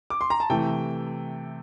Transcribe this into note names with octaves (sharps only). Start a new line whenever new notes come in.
D6
C6
A#5
A5
C3 E3 A3 G5